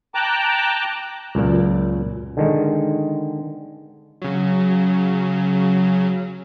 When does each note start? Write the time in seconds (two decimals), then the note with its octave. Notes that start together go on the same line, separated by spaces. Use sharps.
0.15 G5 A5 A#5 D6 F#6
1.35 C#2 F#2 A#2
2.37 D3 D#3 G#3
4.22 C#3 F#3